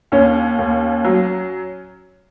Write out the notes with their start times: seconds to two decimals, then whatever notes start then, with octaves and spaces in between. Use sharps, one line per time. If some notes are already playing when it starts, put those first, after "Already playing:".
0.12 D#2 C#4
0.59 D#2
1.05 F#3